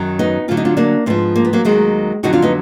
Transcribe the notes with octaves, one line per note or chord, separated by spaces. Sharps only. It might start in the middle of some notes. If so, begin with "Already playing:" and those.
Already playing: F#2 D#3 F#3
B3 D#4
D2 D3 F#3 F4
D#4
D4 F4
A#3 D4
G#2 F3 G#3 B3
A#3
B3
F#3 A#3
D#2 D#3 F#3 G#3
F2 D3 F#3 D#4 F#4
D4 F4
B3 D#4